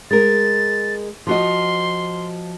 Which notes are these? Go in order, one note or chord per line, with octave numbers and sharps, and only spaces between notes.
G#3 A#4 A6
F3 F#4 D#5 C6